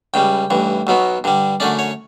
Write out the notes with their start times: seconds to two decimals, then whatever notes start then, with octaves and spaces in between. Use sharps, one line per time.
0.14 C#2 C#3 G3 G5
0.50 A1 G2 E3
0.87 B1 B2 F#3 B3
1.24 G2 D3 G3
1.60 F#2 D3 A3 C#4 D5
1.79 C#5